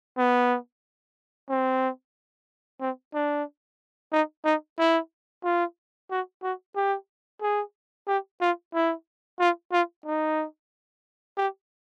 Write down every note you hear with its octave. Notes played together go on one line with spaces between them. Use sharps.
B3
C4
C4
D4
D#4
D#4
E4
F4
F#4
F#4
G4
G#4
G4
F4
E4
F4
F4
D#4
G4